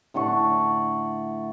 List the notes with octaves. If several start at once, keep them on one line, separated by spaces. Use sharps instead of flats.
A2 D3 F#5 C#6